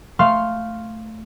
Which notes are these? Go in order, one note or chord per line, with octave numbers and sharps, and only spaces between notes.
A3 F5 C6 F6